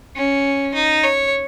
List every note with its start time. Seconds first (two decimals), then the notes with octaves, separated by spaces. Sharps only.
0.16 C#4
0.74 D#4
1.03 C#5